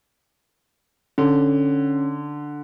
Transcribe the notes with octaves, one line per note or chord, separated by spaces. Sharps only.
D3 C#4